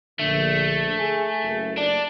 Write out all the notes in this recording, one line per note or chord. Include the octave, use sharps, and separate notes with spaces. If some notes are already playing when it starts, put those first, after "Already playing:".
A#1 D3 A3
G#4 G#5
F#1
D4